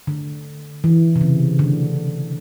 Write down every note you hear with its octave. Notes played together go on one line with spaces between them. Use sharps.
D3
E3
C3
C#3
D3